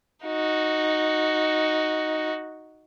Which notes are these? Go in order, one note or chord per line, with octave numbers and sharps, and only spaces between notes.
D#4 F#4